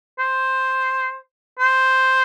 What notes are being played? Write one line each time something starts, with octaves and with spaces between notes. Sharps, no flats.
C5
C5